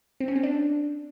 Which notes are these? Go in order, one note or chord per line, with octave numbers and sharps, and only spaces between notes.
C4
C#4
C4
D4